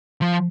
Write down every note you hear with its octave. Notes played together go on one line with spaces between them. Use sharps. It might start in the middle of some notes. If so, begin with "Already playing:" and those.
F3